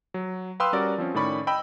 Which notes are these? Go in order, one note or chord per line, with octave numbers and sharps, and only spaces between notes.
F#3
B4 F5 G5 C6 D#6 E6
G3 C#4 F#4 A#4 D5
F3 C4 C#4
A2 D#3 C#4 D5 B5 C#6
D#5 G5 B5 E6